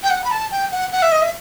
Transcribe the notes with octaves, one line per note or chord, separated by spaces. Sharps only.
G5
F#5
B5
A5
G5
F#5
F#5
E5
D#5
E5